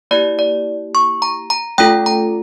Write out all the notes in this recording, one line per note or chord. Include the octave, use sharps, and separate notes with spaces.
A#3 E4 G4 D5
D5
C#6
A#5
A#5
A3 C#4 F4 A4 G5
A#5